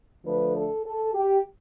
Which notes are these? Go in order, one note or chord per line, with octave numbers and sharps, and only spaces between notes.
D3 F3 A3 D4 B4
A4
A4
G4